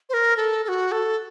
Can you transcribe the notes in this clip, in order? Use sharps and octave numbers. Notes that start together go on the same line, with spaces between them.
C5
A#4
A4
A4
F#4
A4